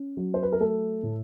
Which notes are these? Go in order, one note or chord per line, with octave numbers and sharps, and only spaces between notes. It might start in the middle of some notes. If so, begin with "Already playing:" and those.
Already playing: C#4
F#3
C5
B4
A#4
A3 A4
A2